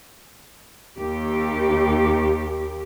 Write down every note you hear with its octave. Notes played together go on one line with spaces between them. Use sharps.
D#2 G4